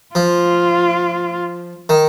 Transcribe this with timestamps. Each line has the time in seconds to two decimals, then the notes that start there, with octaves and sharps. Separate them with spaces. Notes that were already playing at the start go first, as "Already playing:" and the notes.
0.15 F3 F4
1.89 D#3